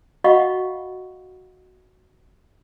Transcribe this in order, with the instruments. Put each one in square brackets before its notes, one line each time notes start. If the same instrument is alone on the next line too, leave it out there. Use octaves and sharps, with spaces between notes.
[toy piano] F#4 D#5 F5 F#5 B5 C#6